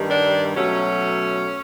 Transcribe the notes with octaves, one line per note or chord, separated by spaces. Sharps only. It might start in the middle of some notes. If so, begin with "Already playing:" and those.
Already playing: G2 D#3 G3
D4
B2 F#3 A3 C#4